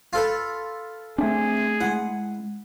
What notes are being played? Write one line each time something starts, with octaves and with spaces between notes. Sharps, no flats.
F4 A4 B4
A3 C4 D4 G#4 E5
G#3 E4 F#5